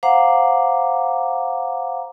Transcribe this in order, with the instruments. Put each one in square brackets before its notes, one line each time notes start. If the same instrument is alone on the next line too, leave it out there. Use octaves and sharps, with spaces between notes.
[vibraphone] C5 F5 F#5 A#5 D6